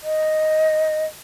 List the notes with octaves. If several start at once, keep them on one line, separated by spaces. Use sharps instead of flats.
D#5